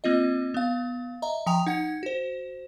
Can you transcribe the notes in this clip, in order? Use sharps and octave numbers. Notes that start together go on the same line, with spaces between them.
A#3 C4 F4 D#5
B3 F5
D#5 E5 A#5
F3 G5 G#5 A#5 D#6 F7
D#4 F#5 G#6
F#4 C5